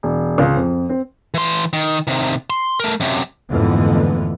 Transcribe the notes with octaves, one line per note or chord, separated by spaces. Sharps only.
E1
C#2
F2
C4
E3 C6
D#3
C3 D#3
C6
A3 A#4
F#2 C3
F2 G#2 D3 E3 A3 B3